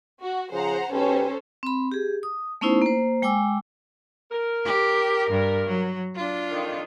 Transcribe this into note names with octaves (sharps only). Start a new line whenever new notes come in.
F#4
C#3 F3 G#4 C5 F#5 A#5
B1 C#4 G4 A4 B4 C5
C4 B5
G4 G#4
D#6
A3 B3 C#4 D#4 E4 C5
A#3 C5
G#3 G5 G#5 D6 E6
A#4
G4
G2
F#3
D4 F4
F2 D#3